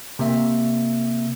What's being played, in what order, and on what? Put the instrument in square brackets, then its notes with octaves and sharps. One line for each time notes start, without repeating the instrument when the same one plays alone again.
[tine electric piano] C3 A#3 E5